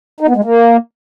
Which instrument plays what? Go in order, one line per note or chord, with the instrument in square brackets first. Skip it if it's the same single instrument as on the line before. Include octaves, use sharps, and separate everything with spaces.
[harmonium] D#4
B3
G#3
A#3